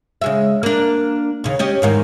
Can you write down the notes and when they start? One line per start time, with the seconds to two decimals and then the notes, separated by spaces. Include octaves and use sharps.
0.21 C#3 G#3 E5
0.63 A#3 D4
1.44 D#2 C#3
1.59 C#4 G4 D#5
1.82 E2 G#2 D#3